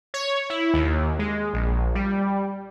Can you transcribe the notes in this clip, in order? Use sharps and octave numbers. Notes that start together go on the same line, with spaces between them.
C#5
E4
D#2
G#3
A#1
G3